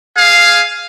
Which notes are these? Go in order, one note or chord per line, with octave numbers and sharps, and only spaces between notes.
G#4 F5